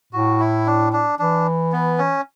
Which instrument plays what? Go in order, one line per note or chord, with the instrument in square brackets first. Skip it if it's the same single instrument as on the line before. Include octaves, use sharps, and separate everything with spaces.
[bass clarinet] A2 [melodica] F#4
[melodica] E4
D4
D4
[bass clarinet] E3 [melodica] D4
[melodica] B3
C#4